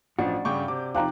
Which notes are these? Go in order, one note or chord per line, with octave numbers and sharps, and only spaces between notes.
A1 F3 D4 F#4
G2 C#3 G5 C#6 D6 G6
C3 D6
C3 F3 C5 F5 G5 A#5 D6 F#6